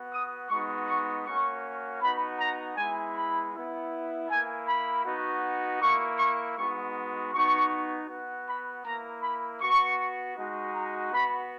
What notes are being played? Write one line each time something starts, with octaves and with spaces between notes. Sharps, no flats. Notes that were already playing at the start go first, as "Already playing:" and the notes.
Already playing: B3 F#4
D#6
G#3 B3 D#4 F#4 C#6
C#6
A#3 C#4 F#4 C#6
B3 D#4 F#4 B5
A#5
G#3 B3 E4 G#5
B5
B3 E4
A#3 E4 G#5
B5
B3 D#4 F#4
A#3 E4 C#6
C#6
G#3 B3 D#4 F#4 C#6
B3 D#4 F#4 C#6
B3 F#4
B5
A#3 E4 A#5
B5
B3 F#4 C#6
G#3 D#4 F#4
A#5
B3 F#4 B5